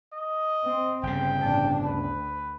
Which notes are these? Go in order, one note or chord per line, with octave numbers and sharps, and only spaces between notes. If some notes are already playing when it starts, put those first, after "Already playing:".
D#5
C4
G1 C#3 G5
A1 D4
D2 B4